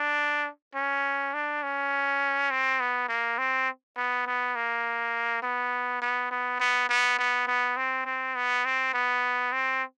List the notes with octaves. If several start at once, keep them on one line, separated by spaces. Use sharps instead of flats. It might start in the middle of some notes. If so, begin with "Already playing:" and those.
Already playing: D4
C#4
D4
C#4
C4
B3
A#3
C4
B3
B3
A#3
B3
B3
B3
B3
B3
B3
B3
C4
C4
B3
C4
B3
C4